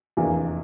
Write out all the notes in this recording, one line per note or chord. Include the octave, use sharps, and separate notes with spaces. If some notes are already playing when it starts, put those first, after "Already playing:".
F1 E2 E3 A#3 D4